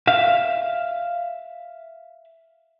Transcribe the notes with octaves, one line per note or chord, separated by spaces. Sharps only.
E5 F5